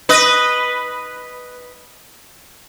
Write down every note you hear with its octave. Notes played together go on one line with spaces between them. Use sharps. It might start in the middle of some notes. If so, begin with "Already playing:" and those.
B4 D#5